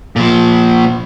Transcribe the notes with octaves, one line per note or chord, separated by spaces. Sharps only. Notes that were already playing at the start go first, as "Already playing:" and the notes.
A#2 F3